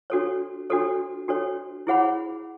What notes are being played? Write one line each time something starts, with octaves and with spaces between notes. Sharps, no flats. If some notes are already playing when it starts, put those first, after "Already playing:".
D4 F#4 A4 C#5
D4 F#4 A4 C#5
D4 F#4 A4 C#5
E4 G#4 C#5 F#5 B5